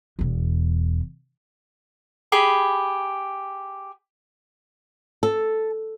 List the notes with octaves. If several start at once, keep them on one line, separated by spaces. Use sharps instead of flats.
E1 E2
G4 G#4 B5
A4